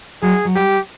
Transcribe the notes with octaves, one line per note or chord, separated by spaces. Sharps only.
F#3 G#4
F#3
G3 G4